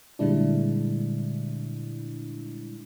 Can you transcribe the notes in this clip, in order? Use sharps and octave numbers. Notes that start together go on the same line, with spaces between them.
A#2 D3 G3 G#3 D4 E4